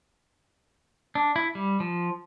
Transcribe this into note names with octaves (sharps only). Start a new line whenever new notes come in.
D4
E4
G3
F3